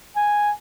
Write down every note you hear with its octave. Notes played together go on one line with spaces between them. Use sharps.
G#5